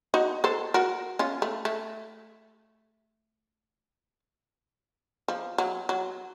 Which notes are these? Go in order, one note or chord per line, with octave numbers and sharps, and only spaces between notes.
D#4 F#4
A4 C5
F#4 A#4
C#4 F4
A3
A3
F3
F#3
F#3